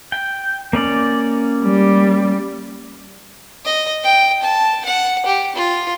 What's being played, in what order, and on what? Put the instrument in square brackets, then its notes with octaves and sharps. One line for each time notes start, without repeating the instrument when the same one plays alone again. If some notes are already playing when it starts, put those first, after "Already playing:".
[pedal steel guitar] G5
A#3 C#4 D5
[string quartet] G3
[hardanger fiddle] D#5
G5
A5
F#5
G4
F4